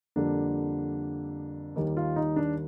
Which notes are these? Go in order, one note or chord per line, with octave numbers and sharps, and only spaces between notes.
F2 D3 G3 A#3 D4
D#2 D#3 G3
F4
D#4
D4